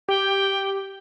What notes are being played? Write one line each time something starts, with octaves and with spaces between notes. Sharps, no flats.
G4 G5